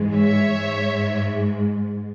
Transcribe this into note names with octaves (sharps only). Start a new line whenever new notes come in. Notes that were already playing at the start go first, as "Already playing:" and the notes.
Already playing: G#2 E3 G#3
C#5 E5
G#2 G#3